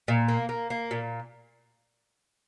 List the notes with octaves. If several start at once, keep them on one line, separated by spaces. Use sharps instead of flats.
A#2
A#3
A#3
A#3
A#2